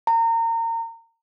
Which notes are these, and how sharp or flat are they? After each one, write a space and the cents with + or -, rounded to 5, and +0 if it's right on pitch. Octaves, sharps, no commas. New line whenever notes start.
A#5 -30